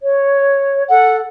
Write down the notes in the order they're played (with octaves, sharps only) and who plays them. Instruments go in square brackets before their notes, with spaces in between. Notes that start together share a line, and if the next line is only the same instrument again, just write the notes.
[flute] C#5
[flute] A4 [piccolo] F#5